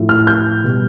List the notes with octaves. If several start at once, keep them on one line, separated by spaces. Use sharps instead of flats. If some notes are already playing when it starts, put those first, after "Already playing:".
Already playing: A2 F3
F6
G6
B2 G3